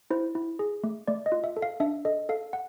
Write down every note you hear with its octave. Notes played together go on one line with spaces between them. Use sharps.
E4 C5
E4
G#4
A3
A3 D5
D#5
F4
E5
A4
F5
D4 E5
A4 D#5
A4 F5
F#5